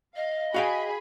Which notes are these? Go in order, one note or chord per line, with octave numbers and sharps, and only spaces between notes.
D#5 F5
F#4 G#4 F5 G5 B5